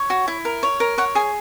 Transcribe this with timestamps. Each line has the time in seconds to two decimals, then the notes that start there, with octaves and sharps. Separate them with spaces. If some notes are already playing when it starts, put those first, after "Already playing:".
Already playing: C#5
0.10 F#4
0.28 E4
0.45 A#4
0.63 C#5
0.80 A#4
0.98 C#5 F#5
1.15 G#4 G#5